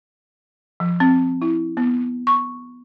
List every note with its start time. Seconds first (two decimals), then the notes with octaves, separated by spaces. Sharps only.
0.80 F3
1.00 C4
1.42 E4
1.77 B3
2.27 C#6